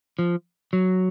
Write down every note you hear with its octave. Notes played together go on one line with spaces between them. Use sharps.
F3
F#3